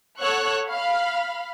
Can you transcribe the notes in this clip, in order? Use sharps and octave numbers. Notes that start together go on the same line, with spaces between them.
A4 C#5 F#5 C#6 E6 F#6
F5 B5